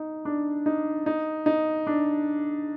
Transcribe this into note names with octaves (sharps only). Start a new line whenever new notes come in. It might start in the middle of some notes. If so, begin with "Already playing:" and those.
Already playing: D#4
D4
D#4
D#4
D#4
D4